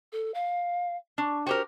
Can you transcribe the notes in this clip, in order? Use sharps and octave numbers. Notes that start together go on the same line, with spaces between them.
A4
F5
D4 C#6
F#4 G4 A#4 C5